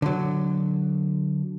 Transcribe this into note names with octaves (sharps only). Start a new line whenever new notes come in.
D3 F#3